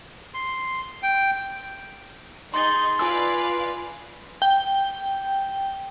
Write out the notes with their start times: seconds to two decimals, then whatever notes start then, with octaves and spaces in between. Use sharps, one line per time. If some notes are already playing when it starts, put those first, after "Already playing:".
0.34 C6
1.03 G5
2.54 D#4 G#4 C6 G6 A6
2.99 F4 B4 D5 F5 G#5 D6 E6
4.42 G5